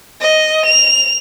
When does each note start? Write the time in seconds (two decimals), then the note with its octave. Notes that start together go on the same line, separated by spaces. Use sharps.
0.21 D#5
0.66 F7